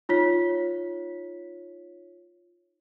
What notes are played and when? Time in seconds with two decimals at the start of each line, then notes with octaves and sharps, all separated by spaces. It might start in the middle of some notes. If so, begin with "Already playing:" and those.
0.09 D#4 F4 C#5 B6